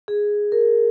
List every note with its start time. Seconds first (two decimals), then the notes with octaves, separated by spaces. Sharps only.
0.08 G#4
0.52 A#4